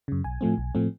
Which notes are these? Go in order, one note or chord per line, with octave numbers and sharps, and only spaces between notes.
F#2 C#3
B1 G#5
A2 F3 A3 C4
B1
A2 F3 A3 C4